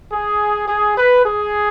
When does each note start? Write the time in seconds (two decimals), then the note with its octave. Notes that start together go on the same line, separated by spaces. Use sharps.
0.12 G#4
0.68 G#4
0.98 B4
1.25 G#4